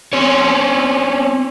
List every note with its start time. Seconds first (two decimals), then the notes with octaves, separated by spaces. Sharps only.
0.13 C4 C#4 C#5